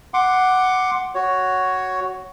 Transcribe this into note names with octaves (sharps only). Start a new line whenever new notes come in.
F#5 C6 D6
F#4 C#5